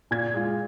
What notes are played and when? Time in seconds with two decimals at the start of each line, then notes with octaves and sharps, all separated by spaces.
0.11 A#2 G#6
0.34 G#3 F4